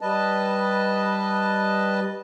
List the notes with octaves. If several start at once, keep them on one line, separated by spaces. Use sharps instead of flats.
G3 B4 D#5 A5